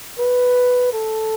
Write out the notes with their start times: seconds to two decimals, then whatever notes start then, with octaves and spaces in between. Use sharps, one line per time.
0.19 B4
0.93 A4